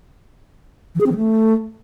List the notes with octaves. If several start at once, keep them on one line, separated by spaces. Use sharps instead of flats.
E3
G#4
C4
E3
A3